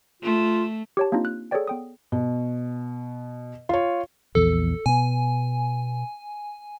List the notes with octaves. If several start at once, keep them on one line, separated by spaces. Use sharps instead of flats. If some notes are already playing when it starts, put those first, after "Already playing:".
A3 F4
G4 C#5 A5
A#3 C4 D4 D#4 F4
F#6
G#4 A4 B4 C#5 D5 G5
B3 G5 D#6
B2
F4 C#5
A#1 E2 A4
B2 B3 G#5